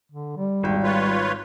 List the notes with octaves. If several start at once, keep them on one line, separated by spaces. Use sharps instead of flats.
D3
G3
G#1 E2 G5
F4 B4 C#5